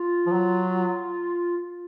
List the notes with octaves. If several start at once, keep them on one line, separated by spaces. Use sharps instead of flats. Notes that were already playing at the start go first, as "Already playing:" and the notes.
Already playing: F4
F3
F#3
F4